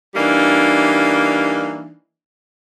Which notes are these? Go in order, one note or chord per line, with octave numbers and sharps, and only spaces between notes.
E3 G3 A#3 D4 D#4